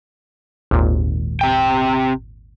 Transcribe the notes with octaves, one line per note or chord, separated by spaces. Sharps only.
G#1 D#2 A#2
C3 G5